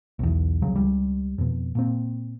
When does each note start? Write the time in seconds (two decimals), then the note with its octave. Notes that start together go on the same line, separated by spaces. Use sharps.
0.19 B1 E2
0.62 C2 C#3 F#3
0.76 C#2 G3
1.38 F2 B2
1.75 A#2 A#3 C4